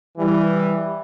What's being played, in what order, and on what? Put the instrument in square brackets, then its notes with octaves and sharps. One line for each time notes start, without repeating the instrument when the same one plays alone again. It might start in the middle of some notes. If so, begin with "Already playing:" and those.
[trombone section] E3 G3